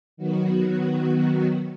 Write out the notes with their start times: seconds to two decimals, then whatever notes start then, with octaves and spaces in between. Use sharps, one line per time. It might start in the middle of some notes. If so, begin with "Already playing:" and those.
0.17 D#3 F#3 B3 F#4